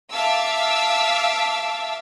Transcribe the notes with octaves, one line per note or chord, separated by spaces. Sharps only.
E5 F5 A5 D6 E6